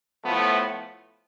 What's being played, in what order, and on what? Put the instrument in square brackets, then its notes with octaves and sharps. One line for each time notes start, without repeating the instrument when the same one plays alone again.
[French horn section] A2 F3 A3 B3